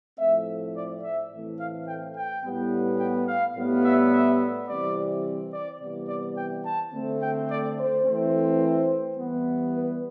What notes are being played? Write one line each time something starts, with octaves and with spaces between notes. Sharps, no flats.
A2 F3 A3 C4 E5
D5
E5
A2 E3 A3 C4
F5
G5
G5
A2 G3 B3
G5
F5
A2 G3 B3
E5
E5
C3 E3 G3 C4 D5
D5
C3 E3 G3 B3
D5
G5
A5
D3 A3 C4
G5
D5
C5
E3 A3 C4
C5
E3 G3 B3
B4